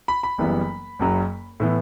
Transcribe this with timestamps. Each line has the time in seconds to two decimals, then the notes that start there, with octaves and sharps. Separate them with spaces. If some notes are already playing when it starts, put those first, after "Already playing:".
0.08 B5
0.23 B5
0.38 F#1 F#2 E3 G3 B3
0.99 F#1 F#2 F#3
1.60 A2 E3 B3